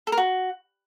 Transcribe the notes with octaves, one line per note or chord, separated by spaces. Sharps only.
A4
A#4
F#4